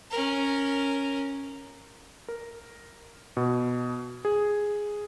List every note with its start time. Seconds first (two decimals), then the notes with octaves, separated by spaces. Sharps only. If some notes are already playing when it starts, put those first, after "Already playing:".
0.11 C#4 A#4
2.28 A#4
3.37 B2
4.25 G#4